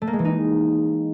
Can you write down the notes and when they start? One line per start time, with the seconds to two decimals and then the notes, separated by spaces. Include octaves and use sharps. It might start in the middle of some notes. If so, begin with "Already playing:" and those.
0.02 A3
0.07 A#3
0.13 G#3
0.19 E3
0.25 D#4